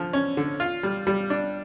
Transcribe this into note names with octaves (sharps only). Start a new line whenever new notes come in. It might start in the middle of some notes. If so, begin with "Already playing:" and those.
Already playing: D3 F3
C#4
D3
F4
G3
G3
D4